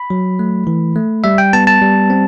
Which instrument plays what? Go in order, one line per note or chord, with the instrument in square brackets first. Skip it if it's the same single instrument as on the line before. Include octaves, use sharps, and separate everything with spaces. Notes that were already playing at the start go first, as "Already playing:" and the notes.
Already playing: [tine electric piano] B5
F#3
A3
E3
A3
G3 E5
G5
B3 A5
A5
G3
C4